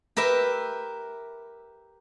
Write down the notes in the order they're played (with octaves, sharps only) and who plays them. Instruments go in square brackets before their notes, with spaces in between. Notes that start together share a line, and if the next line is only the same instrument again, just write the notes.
[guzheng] G4 A#4 B4 E5